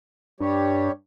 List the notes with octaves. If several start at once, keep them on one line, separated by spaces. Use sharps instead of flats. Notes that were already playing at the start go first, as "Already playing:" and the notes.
G2 G3 G4 C#5